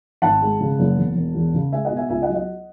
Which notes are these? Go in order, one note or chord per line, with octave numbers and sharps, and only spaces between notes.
G#1 F#5 A5
G#3
C#3
F#1
E1
E1
E2
C#3
G#3 E5 G#5
D#5 F#5
B2
E5 G#5
C#2 E5 G#5
D#5 F#5
F#3
D#5 F#5